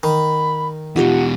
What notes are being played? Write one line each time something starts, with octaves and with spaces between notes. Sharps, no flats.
D#3 B5
E2 B2 D#4 F4 G4 F#5